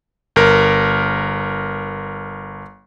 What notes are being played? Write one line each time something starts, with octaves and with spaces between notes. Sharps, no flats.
G1 A#4